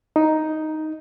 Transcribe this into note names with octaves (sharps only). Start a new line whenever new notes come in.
D#4